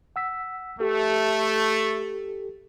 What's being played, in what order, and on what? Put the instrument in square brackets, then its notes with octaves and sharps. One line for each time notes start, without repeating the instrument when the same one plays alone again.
[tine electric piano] F#5 E6 B6
[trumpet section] A3 [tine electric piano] G4 A4